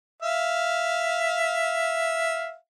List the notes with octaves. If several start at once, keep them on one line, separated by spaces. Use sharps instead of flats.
E5 F5